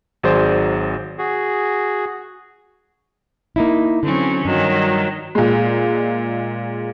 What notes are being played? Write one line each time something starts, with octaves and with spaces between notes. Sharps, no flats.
G#1 F#3 G#4 C5 D5
F#4 G#4
A#3 D#4 E4
D3 F#3 C4 C#4
G2 D#3 F#3
A#2 G#3